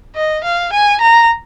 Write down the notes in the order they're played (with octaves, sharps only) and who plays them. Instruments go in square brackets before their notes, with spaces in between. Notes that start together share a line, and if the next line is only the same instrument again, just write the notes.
[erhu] D#5
F5
G#5
A#5